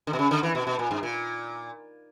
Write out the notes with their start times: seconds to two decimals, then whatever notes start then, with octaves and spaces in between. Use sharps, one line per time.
0.07 D3
0.13 B2
0.19 C#3
0.31 D3
0.43 E3
0.55 B2
0.67 B2
0.79 A#2
0.91 G2
1.03 A#2